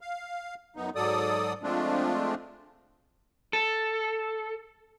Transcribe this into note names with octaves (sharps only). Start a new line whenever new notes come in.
F5
F#2 B3 D#4
G#2 F#3 A4 D5 D#6
F3 G#3 A3 C4 D4 F4
A4